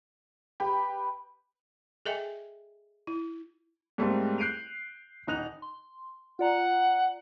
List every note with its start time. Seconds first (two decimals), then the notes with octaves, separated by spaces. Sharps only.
0.60 G4 B4 B5
2.06 G#4 A4 D#5 E5 G5 G#5
3.07 E4
3.98 G#2 G3 A3 A#3 C4 G#4
4.38 F#6 G6 C7 D7 D#7 F7
5.27 D#1 D#4 F#6 F7
5.62 C6
6.39 F4 D5 F#5 A#5